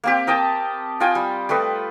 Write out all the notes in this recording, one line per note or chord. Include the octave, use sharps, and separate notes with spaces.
A#3 C4 G4
A#4 D#5 G5 A5
F4 D#5 G5 G#5
G3
G3 A3 B4 D#5